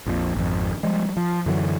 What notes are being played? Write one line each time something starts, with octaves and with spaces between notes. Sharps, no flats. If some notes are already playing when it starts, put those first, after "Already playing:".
A#1 F2 A#2
G#1 F2
F3 G3 G#3
F3
F#2 D3 E3 F#3